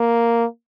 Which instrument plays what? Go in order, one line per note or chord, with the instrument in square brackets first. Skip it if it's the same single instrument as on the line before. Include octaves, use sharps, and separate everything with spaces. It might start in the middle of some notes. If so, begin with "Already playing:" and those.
Already playing: [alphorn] A#3